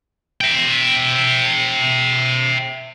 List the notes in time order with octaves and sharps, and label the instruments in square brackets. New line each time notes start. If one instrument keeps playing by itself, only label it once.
[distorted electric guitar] E5 G5